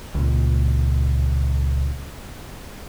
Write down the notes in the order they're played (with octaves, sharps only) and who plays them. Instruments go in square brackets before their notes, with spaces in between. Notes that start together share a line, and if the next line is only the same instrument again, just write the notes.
[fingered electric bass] C#2 A#2